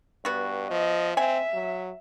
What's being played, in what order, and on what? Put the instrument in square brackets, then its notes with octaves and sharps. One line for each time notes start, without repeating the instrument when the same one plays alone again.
[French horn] G2 [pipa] B3 F#4
[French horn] F3 [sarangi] D#5
[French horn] C4 [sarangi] E5 [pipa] G#5
[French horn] F#3